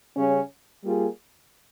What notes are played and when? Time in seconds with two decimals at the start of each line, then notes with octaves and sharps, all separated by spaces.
0.15 C#3 G3 C#4
0.83 G3 A#3 F4 G#4